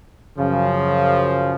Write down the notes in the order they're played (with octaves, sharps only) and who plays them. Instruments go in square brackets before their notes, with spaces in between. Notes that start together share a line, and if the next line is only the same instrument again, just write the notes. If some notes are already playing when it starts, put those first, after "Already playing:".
[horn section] F#2 C#3 F3